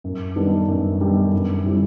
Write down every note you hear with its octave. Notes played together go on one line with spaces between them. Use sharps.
F#2
D#3 G3 B3 D4
F#2
D#3 G3 B3 D4
F#2
D3 G3 C4 E4